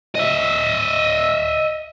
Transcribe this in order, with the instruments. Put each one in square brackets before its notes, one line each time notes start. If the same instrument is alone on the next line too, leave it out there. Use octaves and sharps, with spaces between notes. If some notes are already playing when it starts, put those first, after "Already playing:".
[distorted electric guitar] D#5 E5